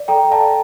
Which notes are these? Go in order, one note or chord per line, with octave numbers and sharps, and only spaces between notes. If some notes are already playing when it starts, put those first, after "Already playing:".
Already playing: D5
A4 G5 A#5
D5 F5 A5